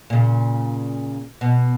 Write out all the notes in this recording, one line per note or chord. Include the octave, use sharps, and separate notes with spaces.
A#2 C#3
B2